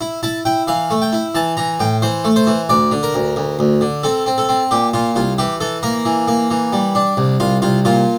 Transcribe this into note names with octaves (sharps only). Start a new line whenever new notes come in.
E4
E4 A5
E4 G5
E3 F5
A3
G5
E4
E3 A5
E3 A#5
A2 G5
E3 C5
A3
C5
E3
D2 D5
D3
A#4
D2
D2
D2
D3
C4 A4
C4
A4
C4
A#2 G4
A#2 F4
C2 F4
E3 G4
E3 A4
A#3 A#4
E3
A#3
E3
G3
D4
C2
C2 F4
C2 F4
A#2 F4